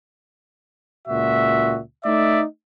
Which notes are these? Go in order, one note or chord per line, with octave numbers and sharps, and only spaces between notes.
C#2 A#2 F#4 E5
A3 D#4 D5 E5